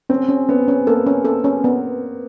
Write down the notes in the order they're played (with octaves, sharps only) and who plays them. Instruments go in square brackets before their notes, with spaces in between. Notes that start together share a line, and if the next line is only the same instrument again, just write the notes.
[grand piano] C4 [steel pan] C#4
[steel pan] C#4
[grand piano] B3 [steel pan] C#4
[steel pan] C#4
[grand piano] A#3 [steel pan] A4
[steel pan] C#4
A4
C#4
B3